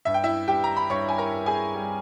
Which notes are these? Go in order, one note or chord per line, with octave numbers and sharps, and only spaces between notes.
G2 E5
G5
E4 E5
G2 G4 G5
A#5
B5
G2 C#5 C#6
G#5
A#4 A#5
G2
G#4 G#5
G3